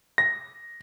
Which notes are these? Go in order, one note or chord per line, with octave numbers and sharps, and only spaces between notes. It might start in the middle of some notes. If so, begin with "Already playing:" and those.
A#6